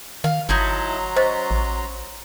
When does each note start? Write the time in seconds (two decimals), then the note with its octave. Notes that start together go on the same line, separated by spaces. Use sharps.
0.24 D#3 F5
0.49 G1 F#3 D#4 E4 A4 A#5 C6
1.16 C#4 C5 D#5
1.51 A1